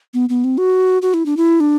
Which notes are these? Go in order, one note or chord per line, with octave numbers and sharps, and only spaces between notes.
B3
B3
C4
F#4
F#4
E4
D4
E4
D4